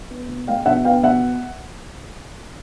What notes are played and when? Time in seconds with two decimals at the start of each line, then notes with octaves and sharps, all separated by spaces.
0.11 B3
0.29 B2
0.48 G#3 F5 G5
0.66 B2 E5 F#5
0.85 B3 F5 G5
1.03 B2 E5 F#5